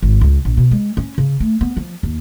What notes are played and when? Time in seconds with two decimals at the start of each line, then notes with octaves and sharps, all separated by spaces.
0.03 G#1
0.21 C#2
0.45 A#1
0.57 B2
0.71 G#3
0.97 C#4
1.18 C#3
1.40 A3
1.61 B3
1.77 F3
2.03 D#2